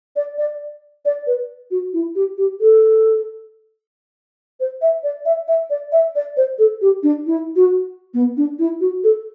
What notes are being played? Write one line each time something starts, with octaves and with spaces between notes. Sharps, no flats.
D5
D5
D5
B4
F#4
E4
G4
G4
A4
C5
E5
D5
E5
E5
D5
E5
D5
C5
A4
G4
D4
E4
F#4
B3
D4
E4
F#4
A4